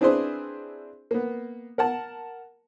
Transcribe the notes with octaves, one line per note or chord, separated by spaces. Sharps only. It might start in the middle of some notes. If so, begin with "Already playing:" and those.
C4 D4 E4 G#4 B4 C5
A#3 B3
A#4 F#5 A5